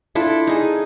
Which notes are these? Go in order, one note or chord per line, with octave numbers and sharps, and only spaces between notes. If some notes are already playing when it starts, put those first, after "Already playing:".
D4 E4 F4 A4
D#4 G#4